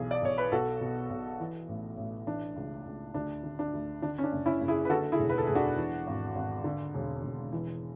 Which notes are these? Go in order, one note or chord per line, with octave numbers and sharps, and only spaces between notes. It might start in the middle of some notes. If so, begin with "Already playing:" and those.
Already playing: B1 E3 G#4
D5
B1 C#5
B4
B1 F#4 A4
B2
B1
E3
A1
A1
E3 D4
C#2
C#2
D2 D4
D3
D4
D2
D3 D4
C#4
D4
F#1
C#4 E4
F#1
E4 G#4
B4
D3 F#4 A4
E4 G#4
E1
B4
A4
E1 G#4
D4 F#4
E3
G#1
G#1
D3
E1
E1
E3